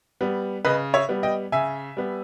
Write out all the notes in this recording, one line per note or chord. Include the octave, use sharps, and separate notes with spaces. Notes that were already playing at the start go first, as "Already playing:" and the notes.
G3 B3
C#3 B4 D#5
C#5 E5
G3 B3
D#5 G5
C#3 E5 G#5
G3 B3